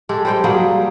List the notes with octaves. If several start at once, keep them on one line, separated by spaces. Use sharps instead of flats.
G#3 G4 A4
G3 C5 G5
F#3 G3 A#3 G#4